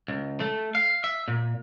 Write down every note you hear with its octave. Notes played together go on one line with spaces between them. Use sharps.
C#2
A3
F5
E5
A#2